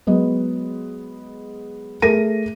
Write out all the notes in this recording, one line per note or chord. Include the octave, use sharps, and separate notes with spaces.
F#3 G#3 B3 D#5
A3 G#4 A#4 A#6 D#7